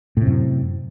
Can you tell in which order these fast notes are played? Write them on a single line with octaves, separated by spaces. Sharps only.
A2 C3 F#2